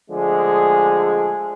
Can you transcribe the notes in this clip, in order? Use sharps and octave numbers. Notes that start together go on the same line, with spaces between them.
D3 F3 G#3 A3 G#4